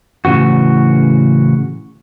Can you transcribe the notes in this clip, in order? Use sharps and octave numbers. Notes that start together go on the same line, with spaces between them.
A2 C#3 E3 F#4